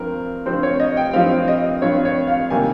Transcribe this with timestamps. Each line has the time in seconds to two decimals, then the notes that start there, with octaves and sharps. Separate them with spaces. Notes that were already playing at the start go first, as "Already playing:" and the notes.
Already playing: G2 F3 C4 A#4
0.46 G2 F3 C4 C5
0.63 C#5
0.80 D#5
0.97 G5
1.13 G2 F3 C4 F5
1.48 D#5
1.82 G2 F3 C4 C#5
2.05 C#5
2.27 F5
2.50 C3 D#3 G3 A#3 G#5